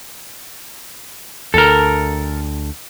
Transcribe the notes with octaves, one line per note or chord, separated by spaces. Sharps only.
D2 A4 A#4